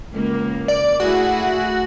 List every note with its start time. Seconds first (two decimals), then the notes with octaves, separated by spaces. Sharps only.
0.13 C#2 A#3
0.68 D5
1.00 A3 E4 F#4 G#4